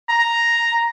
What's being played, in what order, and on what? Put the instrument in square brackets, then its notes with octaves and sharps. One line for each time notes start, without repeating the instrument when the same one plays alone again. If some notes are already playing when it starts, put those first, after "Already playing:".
[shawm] A#5